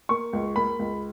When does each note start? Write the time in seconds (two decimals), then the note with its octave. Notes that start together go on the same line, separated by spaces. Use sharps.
0.09 A#3 C#6
0.33 C#2
0.56 A#3 B5
0.79 C#2